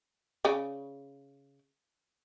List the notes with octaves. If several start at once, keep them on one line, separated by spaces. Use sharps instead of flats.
C#3 D5 G#5